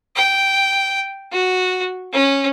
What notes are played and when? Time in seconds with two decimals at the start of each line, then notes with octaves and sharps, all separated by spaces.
0.16 G5
1.32 F#4
2.13 C#4